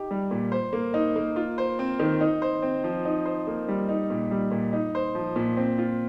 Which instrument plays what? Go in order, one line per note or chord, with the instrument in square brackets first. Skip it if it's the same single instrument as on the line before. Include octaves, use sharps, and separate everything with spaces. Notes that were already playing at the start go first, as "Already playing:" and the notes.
Already playing: [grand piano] D#4 G4
G3
A#2
C5
A#3
D#4
A#3
F4
C5
C4
D#3
D#4
C5
C4
F3
D#4
C5
A#3
G3
D#4
A#2
G3
A#2
D#4
C5
F3
A#2
C4
F4